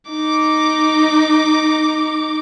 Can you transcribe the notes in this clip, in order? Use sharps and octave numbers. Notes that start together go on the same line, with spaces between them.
D#4 D6